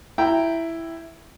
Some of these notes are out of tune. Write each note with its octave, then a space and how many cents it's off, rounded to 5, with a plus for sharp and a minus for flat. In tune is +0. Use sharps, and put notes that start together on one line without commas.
E4 +5 G5 +0 A#5 -5